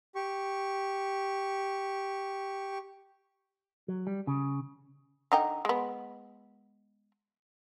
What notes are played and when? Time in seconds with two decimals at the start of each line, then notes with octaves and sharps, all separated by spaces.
0.15 G4 C#6
3.88 F#3
4.07 G3
4.27 C#3
5.32 D3 D#4 G5
5.65 G#3 B3